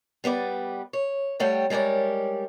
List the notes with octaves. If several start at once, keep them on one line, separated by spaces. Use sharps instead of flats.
G3 B3 B4 D5
C#5
G3 A3 C#5 F#5 G5
G3 G#3 A#4 C#5 D5